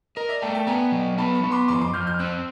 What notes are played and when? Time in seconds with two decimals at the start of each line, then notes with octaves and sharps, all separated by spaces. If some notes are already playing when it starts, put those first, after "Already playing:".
0.16 A#4 D#5
0.29 D5 E5
0.41 A3 G5 A5
0.55 G5 A5
0.67 B3 G#5 A#5
0.92 F#3
1.18 B3 A5 B5
1.35 B5 C#6
1.43 B3
1.51 C6 D6
1.68 F2 C6 D6
1.81 C6 D6
1.93 F2 F6 G6
2.07 F6 G6
2.19 C4 E6 F#6